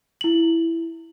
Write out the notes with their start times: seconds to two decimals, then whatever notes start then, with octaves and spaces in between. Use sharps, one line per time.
0.21 E4 F#7